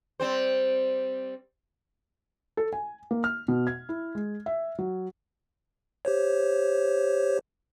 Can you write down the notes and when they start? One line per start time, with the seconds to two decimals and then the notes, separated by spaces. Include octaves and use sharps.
0.20 G3 C4 C5
2.57 A4
2.73 G#5
3.11 A#3
3.24 F6
3.48 B2
3.67 G#6
3.89 E4
4.15 G#3
4.46 E5
4.79 F#3
6.05 G4 C5 C#5